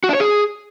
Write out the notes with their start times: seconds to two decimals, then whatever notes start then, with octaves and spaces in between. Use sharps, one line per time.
0.04 F#4
0.09 D4
0.15 C#5
0.20 G#4